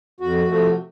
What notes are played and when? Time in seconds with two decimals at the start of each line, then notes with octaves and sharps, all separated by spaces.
0.20 F2 F#4
0.48 C3 F3 A3